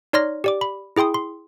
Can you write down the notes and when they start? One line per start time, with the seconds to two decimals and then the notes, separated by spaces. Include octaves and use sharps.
0.13 D#4 C#5 D5 C6 F6 A#6
0.44 G4 D5 D6
0.61 B5
0.96 E4 G#4 G5 C6 D#6
1.14 C6